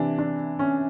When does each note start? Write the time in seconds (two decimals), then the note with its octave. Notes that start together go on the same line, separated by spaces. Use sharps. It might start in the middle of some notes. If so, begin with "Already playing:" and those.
Already playing: C3 E3 D4
0.19 D4
0.59 C#4